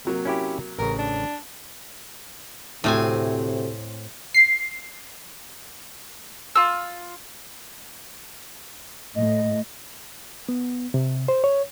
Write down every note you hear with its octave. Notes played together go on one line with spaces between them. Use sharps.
C3 F#3 A#3
C#4 E4 G4
A1 C#3 A#4
D4
D2 A2 C3 C4 G#5
C7
F4 E6
A2 D#5
B3
C3
C5
C#5